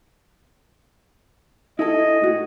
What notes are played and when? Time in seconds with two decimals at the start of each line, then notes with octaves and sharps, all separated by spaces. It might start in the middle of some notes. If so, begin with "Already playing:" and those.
1.79 E4 G#4 A4 D#5
2.22 A2 F#4 G#4